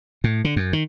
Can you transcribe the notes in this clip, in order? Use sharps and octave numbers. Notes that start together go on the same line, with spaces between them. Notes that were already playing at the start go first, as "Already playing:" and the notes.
A2
D3
F#2
D#3